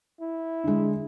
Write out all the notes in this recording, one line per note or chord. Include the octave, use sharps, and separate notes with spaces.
E4
D3 G#3